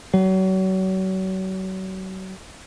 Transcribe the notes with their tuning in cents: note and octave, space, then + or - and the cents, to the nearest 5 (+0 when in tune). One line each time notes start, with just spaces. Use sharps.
F#3 +35